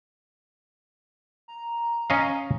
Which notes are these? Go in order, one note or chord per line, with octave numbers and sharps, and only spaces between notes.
A#5
C#4 D#5 F5